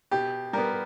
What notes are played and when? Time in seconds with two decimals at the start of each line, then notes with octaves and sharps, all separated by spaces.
0.11 B2 G4
0.53 G3 B3 A#4